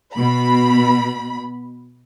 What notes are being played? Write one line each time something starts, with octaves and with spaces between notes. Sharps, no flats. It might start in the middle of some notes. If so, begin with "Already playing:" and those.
B2 B5